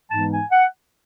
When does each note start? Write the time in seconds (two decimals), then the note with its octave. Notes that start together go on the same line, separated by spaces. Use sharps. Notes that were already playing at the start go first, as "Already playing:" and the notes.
0.10 G#2 E3 G#3 B3 D#4 A5
0.31 G#5
0.51 F#5